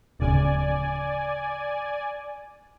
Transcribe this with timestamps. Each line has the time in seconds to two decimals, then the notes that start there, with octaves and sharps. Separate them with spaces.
0.20 D1 C#3 D5 G#5